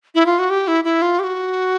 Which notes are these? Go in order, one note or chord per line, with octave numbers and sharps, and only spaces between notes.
E4
F4
F#4
G4
E4
E4
F4
G4
F#4